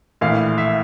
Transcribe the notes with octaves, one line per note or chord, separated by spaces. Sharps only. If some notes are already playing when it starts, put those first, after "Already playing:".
A#1 A2 E3 F5
E5